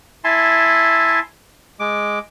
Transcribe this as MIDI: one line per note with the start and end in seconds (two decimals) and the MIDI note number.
0.24 1.20 64
0.24 1.20 76
0.24 1.20 80
0.24 1.20 81
0.24 1.20 84
1.80 2.19 56
1.80 2.19 86